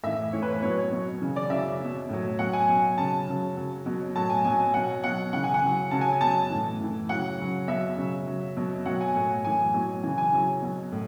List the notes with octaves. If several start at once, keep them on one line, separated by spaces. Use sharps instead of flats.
A2 E3 E5
A2 E3 C#5
B4
B4
B2 F#3 C#5
B2 F#3
C#3 E3
D5
C#3 F#3 E5
B2 F#3
A2 F#3
B2 F#3 F#5
G#5
B2 F#3
C#3 F#3 A5
C#3 F#3
C#3 F#3
B2 F#3
A2 F#3 A5
G#5
B2 F#3 G#5
B2 F#3 F#5
B2 F#3 F#5
C#3 E3 F#5
G#5
F#5
C#3 F#3
C#3 F#3 A5
G#5
G#5
B2 F#3 A5
A2 E3
A2 E3
C#3 F#3 F#5
C#3 F#3
B2 F#3 E5
C#3 F#3
C#3 F#3
B2 F#3
B2 F#3 F#5
G#5
A2 F#3
A2 E3 G#5
B2 F#3
C#3 E3 G#5
G#5
C#3 F#3
B2 F#3
A2